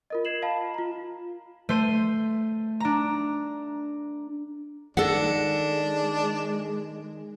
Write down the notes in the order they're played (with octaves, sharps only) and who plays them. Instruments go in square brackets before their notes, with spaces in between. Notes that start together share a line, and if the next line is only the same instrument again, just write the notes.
[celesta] F4 A#4 D#5
D#5 G#6 C7 E7 F#7
D#5 F5 A5 B5
F4 A#5
[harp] A3 C5 D#7
D4 A#5
[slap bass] D#3 [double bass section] G#3 [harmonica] D4 [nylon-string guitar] A4 F#5